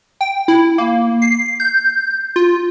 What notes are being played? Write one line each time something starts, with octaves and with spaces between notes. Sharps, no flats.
G5
E4
A#3
C7
G6
F4